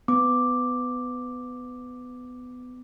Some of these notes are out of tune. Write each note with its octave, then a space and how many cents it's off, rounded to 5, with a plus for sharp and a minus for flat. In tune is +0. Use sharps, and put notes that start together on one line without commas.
B3 +20 D6 +0